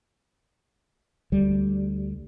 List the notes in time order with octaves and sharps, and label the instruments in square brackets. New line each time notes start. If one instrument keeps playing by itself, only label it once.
[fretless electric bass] D2 G3